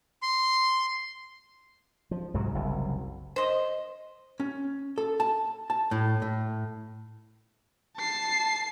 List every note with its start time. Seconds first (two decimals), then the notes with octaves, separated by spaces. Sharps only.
0.22 C6
2.11 F3
2.34 C2 G#2 F#3
2.54 F#1 C2
3.36 C5 D#5
4.40 C#4
4.98 A4
5.20 A5
5.70 A5
5.91 A2
6.22 A2
7.97 A5 C7